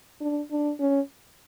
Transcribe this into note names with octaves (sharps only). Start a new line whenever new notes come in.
D4
D4
C#4